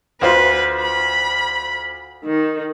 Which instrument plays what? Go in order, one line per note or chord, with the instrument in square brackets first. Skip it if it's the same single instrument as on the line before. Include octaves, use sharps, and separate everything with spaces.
[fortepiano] D2 F4 C5 [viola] B4
[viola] B5
D#3